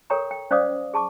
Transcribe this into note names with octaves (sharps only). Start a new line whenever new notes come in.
A4 A#4 C#5 G5 A#5 C#6
G5
C#4 C5 D5 F5 D6 D#6
G#4 A5 C#6 D6